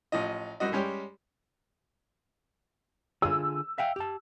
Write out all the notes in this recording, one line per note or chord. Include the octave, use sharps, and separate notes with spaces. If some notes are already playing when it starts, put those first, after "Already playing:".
A1 F3 D#5
F#2 G3 F#4 D#5
G3 G#3 C#4 G4
D3 F4 G#4 E6
E5 F5 G5
G4 A5